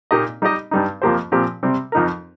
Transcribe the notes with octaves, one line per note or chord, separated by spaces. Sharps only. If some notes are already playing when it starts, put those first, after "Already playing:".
A#2 A#3 D#4 G4 D#5
G3 D#4 G4 D#5
G2 G3 D#4
F2 F3 A#3 G4 C5
A#2 F3 C4 G4
C3 G3 C4
F2 F3 D#4 A#4